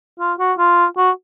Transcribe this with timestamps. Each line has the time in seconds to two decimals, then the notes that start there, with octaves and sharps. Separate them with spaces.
0.19 F4
0.39 F#4
0.58 F4
0.97 F#4